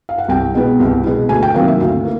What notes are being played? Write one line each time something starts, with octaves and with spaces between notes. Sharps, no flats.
F5
F#5
C2 G5
B2 G#3 B3
C2
B2 G#3 B3
D2 G#5
G5
C3 D#3 F#3 A#3 F5
E5
D2 F5
A#3